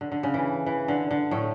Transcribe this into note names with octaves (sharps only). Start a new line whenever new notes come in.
D3
D3
C#3
E3
E3
D3
D3
A2 A3